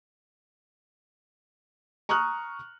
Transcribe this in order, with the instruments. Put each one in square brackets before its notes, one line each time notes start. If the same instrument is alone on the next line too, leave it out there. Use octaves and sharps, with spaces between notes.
[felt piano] A#5 C#6 D#6 F6 F#6